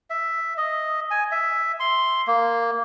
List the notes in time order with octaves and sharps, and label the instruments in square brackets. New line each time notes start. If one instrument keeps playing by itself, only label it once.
[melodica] E5
D#5
G#5
E5
C6
A#3